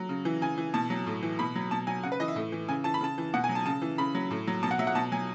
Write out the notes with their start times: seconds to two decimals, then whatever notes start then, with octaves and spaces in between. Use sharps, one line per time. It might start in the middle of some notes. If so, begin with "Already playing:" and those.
Already playing: F#3
0.09 C#3
0.25 E3
0.41 C#3 G#5
0.58 E3
0.74 B2 A5
0.90 F#3
1.07 A2
1.23 E3
1.39 B2 B5
1.55 F#3
1.71 B2 A5
1.87 F#3 G#5
2.03 C#3 F#5
2.12 B4
2.20 E3 D#5
2.28 E5
2.36 A2
2.52 E3
2.68 C#3 G#5
2.84 E3 A5
2.94 B5
3.01 C#3 A5
3.18 E3
3.33 B2 F#5
3.44 G#5
3.49 F#3
3.55 A5
3.66 C#3 A5
3.82 E3
3.98 C#3 B5
4.15 F#3
4.31 A2
4.47 F#3
4.63 B2 A5
4.71 F#5
4.79 F#3 E5
4.87 F#5
4.95 B2 A5
5.12 F#3 G#5